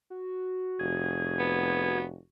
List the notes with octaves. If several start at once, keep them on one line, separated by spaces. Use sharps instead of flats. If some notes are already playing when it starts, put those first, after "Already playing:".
F#4
F1 G#4
B3